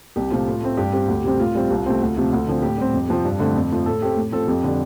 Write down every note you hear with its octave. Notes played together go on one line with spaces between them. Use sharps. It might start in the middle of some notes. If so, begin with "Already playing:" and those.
C2 G4
C3 F3 A3 C4 F4
A2
A3 C4
G2 G4
G3 C4
D2
C3 G3 C4
A2 F4
G3 C4
C2
C3 A3 C4
D2
C3 F3 A3
D2
D3 F3 C4
A2 G4
G3 C4
F2
C3 F3 C4
G2
D3 A3 C4
F2
F3 A3
A2 A4
A3 C4 G4
A2
F3 C4 A4
F2 G4
D3 G3